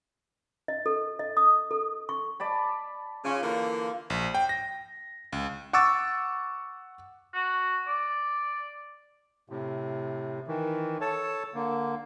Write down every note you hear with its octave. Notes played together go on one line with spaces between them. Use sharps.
D#5
A4
D#5
D#6
A4
C#6
D5 A5 B5
C#3 C#4 F4
D3 E3 A#3
A#1
G5
A#6
C#2
F#5 C#6 D6 E6 A6
F#4
D5
A2 C3
D#3 E3
A4 C#5 A5
D3 A#3